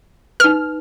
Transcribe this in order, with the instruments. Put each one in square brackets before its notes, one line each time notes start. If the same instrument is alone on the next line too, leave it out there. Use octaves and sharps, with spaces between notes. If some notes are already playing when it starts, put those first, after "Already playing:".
[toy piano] D#4 B4 [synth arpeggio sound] F6